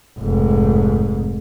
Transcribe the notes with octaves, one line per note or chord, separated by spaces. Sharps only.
F1 G#2